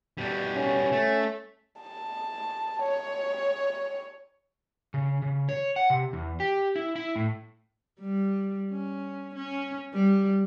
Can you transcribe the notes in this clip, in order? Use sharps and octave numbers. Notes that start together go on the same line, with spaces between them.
B2 G3
C#4
A3
A5
C#5
C#3
C#3
C#5
F#5
C3
E2
G4
E4
E4
A2
G3
C#4
C#4
G3